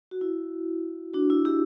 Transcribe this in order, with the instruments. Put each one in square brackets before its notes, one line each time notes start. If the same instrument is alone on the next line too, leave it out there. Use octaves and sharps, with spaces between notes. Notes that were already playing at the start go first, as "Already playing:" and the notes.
[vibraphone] F#4
E4
D4 F#4
E4
E4 G4